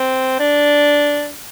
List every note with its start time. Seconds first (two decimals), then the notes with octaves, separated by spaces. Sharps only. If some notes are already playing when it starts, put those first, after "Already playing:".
Already playing: C4
0.39 D4